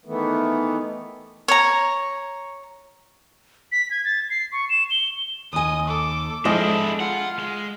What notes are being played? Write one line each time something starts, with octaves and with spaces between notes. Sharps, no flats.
D#3 E3 A3 B3
C#5 A#5
B6
G#6
A6
C7
C#6
E7
G7
D#2 D#5 G#5 D#6
A4 D6
F3 G#3 D4 E4 A4 D#5
F4 F#5
G#3